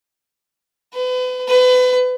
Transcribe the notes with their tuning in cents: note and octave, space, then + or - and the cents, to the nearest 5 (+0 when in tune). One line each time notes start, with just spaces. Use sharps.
B4 +35
B4 +30